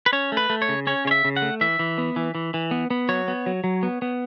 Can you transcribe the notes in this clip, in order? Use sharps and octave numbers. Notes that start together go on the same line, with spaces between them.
B4
C#4 C#5
A3
B4
A3
C#5
C#3
C#4 C#5
C#3 C#5
E5
C#3
F#5
A3
E3 E5
E3
B3
E3
E3
E3
B3
B3
F#3 C#5
B3
F#3
F#3
B3
B3